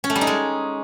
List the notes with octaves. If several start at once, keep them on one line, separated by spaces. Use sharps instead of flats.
C#4
A3
G3
D#4
G#3